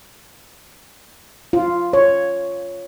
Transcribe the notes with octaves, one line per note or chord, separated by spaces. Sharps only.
F4
C#5